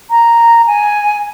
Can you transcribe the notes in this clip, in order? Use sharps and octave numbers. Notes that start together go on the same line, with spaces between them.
A#5
G#5